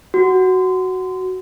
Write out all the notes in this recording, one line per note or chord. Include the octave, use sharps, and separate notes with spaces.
F#4